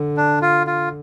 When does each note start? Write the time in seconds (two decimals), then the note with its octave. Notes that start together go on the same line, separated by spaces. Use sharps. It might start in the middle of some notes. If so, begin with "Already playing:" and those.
Already playing: D3
0.17 D4
0.42 F4
0.67 F4